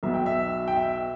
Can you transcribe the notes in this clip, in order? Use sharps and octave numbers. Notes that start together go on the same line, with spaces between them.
B1 B2 E5
G5
E5
G5
E5